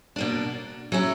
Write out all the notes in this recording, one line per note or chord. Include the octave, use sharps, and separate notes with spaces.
B2 A#3 D4
F#3 C#4 E4